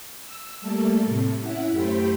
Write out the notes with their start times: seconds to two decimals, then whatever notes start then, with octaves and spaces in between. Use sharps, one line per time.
0.22 E6
0.61 G3 A3 A#3 A4 A5
1.05 A2 C3
1.40 C#4 E4 E5 F#5
1.70 F#2 A3 G4 C5 B5